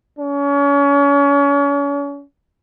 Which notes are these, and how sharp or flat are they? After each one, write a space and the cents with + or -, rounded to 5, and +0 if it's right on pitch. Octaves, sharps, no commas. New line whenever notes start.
C#4 +35